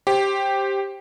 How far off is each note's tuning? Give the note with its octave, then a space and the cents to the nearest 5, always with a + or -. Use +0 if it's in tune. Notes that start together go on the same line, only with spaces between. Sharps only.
G4 +0 C5 +15